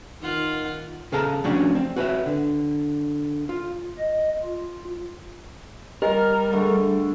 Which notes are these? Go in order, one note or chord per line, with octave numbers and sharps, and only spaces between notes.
D#3 F4 F#5
C#3 G#4 A4 F5 A5 A#5
F3 A3 C#4 D4 F#4 G4
C4
F#4 B4 C#5 E5
D3
F4
D#5
F4
G3 G4 A#4 D#5 G#5
D3 G#3 A3